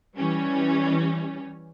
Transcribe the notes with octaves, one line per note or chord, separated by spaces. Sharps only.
E3 G3 C#4